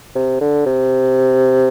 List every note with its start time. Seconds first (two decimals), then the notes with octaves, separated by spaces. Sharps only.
0.15 C3
0.41 D3
0.66 C3